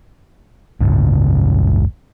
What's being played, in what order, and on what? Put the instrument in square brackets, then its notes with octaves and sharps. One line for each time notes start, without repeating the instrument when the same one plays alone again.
[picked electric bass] F#1 C#2 G#2